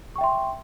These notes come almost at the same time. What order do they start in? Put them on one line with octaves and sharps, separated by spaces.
C#6 G5 E5 C6